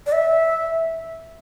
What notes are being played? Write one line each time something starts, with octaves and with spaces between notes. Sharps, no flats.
D5
E5